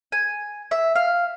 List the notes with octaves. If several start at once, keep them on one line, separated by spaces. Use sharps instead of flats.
G#5
E5
F5